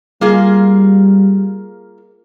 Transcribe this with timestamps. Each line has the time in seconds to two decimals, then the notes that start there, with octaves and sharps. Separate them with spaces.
0.21 G3 A#3 F4 G#4